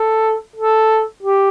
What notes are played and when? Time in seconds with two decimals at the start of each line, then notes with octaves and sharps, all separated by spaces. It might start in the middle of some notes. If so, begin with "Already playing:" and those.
Already playing: A4
0.56 A4
1.23 G4